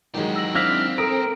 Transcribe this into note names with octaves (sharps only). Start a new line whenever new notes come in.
D#3 E3 F#3 G#3 G4
E6 A#6 F#7
C4 D4 E4 F5 A#6 B6 F#7
A4 A#4 D#6 E6 D7